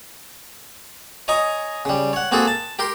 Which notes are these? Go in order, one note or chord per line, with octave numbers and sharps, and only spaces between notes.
C#5 D#5 G#5 A#5 C#6 D#6
C#3 G3
C#5 F#5
A#3 C4 F#4 G#4 A4
A5
G4 A#4 C6